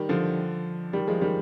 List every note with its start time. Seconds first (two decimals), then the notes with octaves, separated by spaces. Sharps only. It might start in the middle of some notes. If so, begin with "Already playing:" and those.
Already playing: D#3 G3
0.09 D3 F3
0.93 D#3 G3
1.07 F3 G#3
1.21 D#3 G3